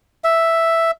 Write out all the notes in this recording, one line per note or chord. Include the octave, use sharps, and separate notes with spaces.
E5